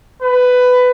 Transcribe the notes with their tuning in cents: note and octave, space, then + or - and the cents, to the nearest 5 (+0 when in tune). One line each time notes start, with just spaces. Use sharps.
B4 +15